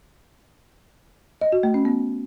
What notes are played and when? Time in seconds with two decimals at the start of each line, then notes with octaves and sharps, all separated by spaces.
1.41 D#5
1.52 F#4
1.63 A3
1.74 C#4
1.85 B3